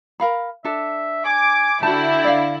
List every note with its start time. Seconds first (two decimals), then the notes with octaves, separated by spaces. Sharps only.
0.20 A#4 F5 B5
0.64 D4 A4 E5
1.25 G#5 D6
1.83 D3 E4 F#4 G5 A5
2.24 D5 F5